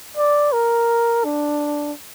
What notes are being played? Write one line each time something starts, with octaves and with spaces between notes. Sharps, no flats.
D5
A#4
D4